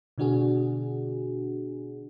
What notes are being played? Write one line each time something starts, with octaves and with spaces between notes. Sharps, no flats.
B2 D3 D4 F#4 G#4